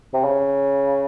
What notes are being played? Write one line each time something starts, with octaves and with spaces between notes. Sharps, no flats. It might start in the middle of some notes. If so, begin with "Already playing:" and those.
C3
C#3